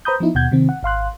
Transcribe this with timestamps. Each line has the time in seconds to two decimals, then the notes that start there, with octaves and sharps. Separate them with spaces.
0.05 B4 C5 A#5 B5 D#6 G6
0.20 F3 B3 D#4 E4
0.35 D#2 B2 F#5 G6 G#6
0.51 C3 D#3 C4
0.69 F#5
0.83 G#1 F5 C6 F#6